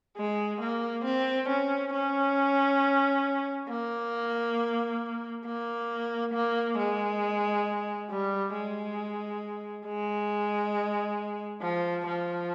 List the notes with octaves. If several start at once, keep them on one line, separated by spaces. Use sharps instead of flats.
G#3
A#3
C4
C#4
C#4
A#3
A#3
A#3
G#3
G3
G#3
G#3
F3
F3